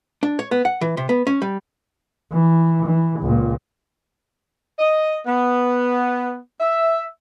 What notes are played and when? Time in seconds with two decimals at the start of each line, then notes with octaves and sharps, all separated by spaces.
0.23 D4
0.39 C#5
0.51 B3
0.65 F#5
0.81 E3
0.97 C3
1.09 B3
1.27 C#4
1.42 G3
2.32 E3
2.86 E3
3.20 C#2 A#2
4.79 D#5
5.26 B3
6.61 E5